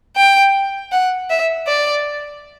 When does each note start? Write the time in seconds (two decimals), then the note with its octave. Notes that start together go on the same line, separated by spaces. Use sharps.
0.16 G5
0.92 F#5
1.30 E5
1.67 D5